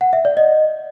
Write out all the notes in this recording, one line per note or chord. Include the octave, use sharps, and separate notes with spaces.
F#5
E5
D5
D#5